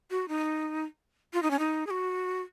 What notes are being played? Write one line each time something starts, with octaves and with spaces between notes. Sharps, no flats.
F#4
D#4
F4
D#4
C#4
D#4
G#4
F#4